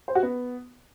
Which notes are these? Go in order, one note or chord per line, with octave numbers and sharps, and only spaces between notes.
C5
F#4
B3